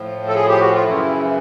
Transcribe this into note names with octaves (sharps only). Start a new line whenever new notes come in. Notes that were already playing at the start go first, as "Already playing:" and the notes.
Already playing: A2 F3
A4
G#4
G4
F#4
F4
F#2 C#3 E3 E4